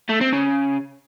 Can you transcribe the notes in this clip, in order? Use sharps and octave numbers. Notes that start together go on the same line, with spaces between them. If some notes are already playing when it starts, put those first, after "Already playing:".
A3
C4
C#3